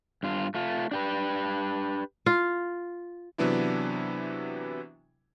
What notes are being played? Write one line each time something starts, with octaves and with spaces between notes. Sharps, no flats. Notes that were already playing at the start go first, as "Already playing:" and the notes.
G2 F4
A3 F4
D4 G4 B4
F4
C3 E3 F#3 B3 D4 E4